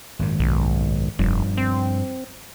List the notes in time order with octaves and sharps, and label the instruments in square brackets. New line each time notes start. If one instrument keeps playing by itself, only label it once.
[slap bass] G#1 F#2 A#2
[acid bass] B1
[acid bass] F1 [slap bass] G2 F3
[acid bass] C4